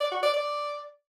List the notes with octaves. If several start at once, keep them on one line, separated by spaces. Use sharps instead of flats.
D5
F#4
D5
D5